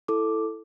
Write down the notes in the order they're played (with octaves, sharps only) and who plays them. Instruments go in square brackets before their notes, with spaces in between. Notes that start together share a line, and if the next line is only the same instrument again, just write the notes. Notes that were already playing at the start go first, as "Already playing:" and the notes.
[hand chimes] E4 A4 D6